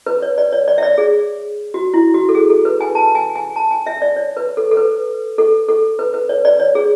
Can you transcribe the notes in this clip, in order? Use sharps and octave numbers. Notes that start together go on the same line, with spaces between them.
B4
C#5
D5
C#5
D5
E5
D5
G#4
F#4
E4
F#4
A4
G#4
A4
B4
G#5
A5
G#5
G#5
A5
G#5
E5
D5
C#5
B4
A4
A4
B4
A4
A4
B4
B4
C#5
D5
C#5
G#4